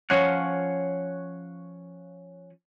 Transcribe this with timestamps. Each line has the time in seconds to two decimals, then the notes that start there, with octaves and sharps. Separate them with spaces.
0.10 F3 C#4 C#5 F5 F#5